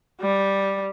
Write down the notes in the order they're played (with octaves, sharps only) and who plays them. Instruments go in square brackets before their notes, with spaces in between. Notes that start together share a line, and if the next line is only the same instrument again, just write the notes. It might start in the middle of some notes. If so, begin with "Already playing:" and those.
[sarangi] G3